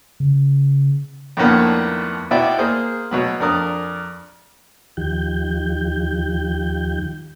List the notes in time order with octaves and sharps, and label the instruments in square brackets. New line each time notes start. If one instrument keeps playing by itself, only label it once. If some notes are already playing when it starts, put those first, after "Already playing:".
[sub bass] C#3
[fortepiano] F2 A2 D#3 A#3 B3 D4
B2 B3 E4 D5 E5 G5
A#3 G#4 C5
B2 F#3 B3
F2 D4 A#4 D#6
[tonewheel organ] D#2 D#3 F3 G4 G6